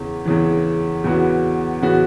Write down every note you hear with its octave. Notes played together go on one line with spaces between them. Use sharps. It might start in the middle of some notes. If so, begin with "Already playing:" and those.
Already playing: E2 C#3 E3
E2 C#3 E3
E2 C#3 E3 B3 F#4
C#3 E3 B3 F#4